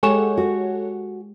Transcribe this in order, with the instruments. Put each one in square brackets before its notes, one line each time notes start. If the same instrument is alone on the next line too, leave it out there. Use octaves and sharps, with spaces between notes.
[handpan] G#3 G4 [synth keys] A4 C#5 F#5 [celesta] G#5 C#6 E7
[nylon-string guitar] F#4